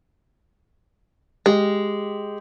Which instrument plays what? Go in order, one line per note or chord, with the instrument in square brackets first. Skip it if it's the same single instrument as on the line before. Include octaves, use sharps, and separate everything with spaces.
[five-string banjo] G#3 [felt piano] G4